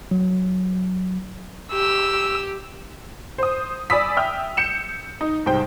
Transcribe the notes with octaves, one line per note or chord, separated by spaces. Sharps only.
F#3
G4 E6
C5 D#6
D5 G#5 B5 D#6 E6 B6
E5 G5 F6
G6 C#7 E7
D#4
C2 G#2 C5 G5